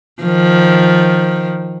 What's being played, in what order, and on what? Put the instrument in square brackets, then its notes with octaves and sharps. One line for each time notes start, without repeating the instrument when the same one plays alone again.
[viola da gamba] D#3 F3